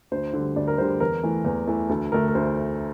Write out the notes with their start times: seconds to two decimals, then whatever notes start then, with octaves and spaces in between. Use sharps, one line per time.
0.11 D2 C5
0.33 D3 G3
0.56 D2 D5
0.68 A#4
0.78 D3 G3 C5
1.00 E2 A#4
1.24 E3 A3
1.45 E2
1.67 E3 A3
1.89 D2 A4
2.12 D3 A3 A#4
2.28 A#4
2.35 D2 C5